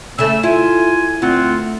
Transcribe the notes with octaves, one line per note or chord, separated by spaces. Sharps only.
C#3 A3 E6
E4 F4 G#5
D2 C4 F4 F#5